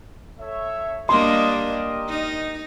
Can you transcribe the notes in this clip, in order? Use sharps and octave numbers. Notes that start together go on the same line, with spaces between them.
A4 C#5 E5
G3 A#3 D4 D#5 C6
G4 A#4 D#5
D#4